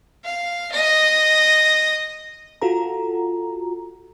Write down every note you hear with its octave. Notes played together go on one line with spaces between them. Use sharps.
F5
D#5
F4 F#4 A4 A#5